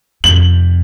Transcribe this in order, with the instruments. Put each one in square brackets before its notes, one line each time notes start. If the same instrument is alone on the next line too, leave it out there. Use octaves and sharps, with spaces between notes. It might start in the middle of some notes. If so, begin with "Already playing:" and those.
[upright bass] F2 C3 [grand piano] F#7